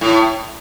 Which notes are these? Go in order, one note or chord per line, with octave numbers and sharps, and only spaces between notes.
A2